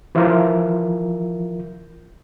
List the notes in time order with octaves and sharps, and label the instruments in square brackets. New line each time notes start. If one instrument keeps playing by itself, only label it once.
[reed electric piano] E3 F3 E4 F4 A#4